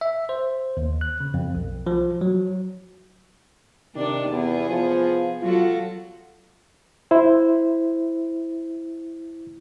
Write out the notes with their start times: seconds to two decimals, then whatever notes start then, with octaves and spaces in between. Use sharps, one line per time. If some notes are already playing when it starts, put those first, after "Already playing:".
0.01 E5
0.29 C5
0.77 D#2
1.01 F#6
1.21 C#3
1.34 F2
1.55 B1
1.87 F3
2.21 F#3
3.95 C3 D#3 D4 D5
4.30 E2 B3 G#4
4.70 F3
5.42 F#3 F4 F#4 A4
7.11 E4 C5